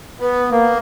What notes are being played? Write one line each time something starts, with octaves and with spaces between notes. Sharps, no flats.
B3
A#3